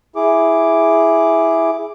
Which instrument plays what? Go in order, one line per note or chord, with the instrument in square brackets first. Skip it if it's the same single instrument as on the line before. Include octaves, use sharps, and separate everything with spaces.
[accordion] E4 G#4 D6